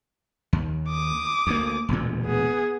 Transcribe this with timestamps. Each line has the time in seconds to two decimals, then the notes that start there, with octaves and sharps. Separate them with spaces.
0.53 D#2
0.89 D6 D#6
1.47 D2 A#3
1.89 E1 D2 A#2
2.23 B3 G#4